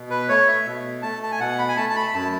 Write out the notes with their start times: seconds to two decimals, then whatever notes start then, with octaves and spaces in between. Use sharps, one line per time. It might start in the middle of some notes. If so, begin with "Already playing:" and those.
Already playing: B2
0.10 B4
0.29 A3 C#5
0.47 E5
0.65 B2
1.02 A3 A5
1.23 A5
1.32 G#5
1.40 B2 F#5
1.59 B5
1.68 G#5
1.76 A3 A5
1.90 A5
1.96 B5
2.14 F#2 A5